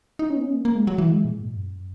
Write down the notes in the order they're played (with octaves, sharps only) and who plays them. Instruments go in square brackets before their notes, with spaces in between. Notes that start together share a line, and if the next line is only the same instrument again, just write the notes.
[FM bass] D#4
C#4
B3
C#4
A#3
A#3
G#3
F#3
E3
G#3
A#2
G#2
F#2